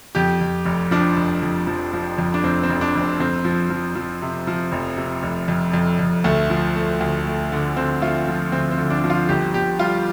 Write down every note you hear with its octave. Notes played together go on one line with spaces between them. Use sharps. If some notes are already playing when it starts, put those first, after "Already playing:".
F2 G4
F2
F1
F3 D4
F1
F2
F3
F3
F2
D4
F1 C4
C4
F1
D4
F1
C4
F2 C4
F3
F3
F3
C3
F3
F1
C3
F1
F2
F2
F2
D2 A3
F3
A3
D2
A3
D3
D3 C4
A3 F4
F3
D2 C4
C4
D3
D4
F3
F4
G1 G4
G1 G4
G3 F4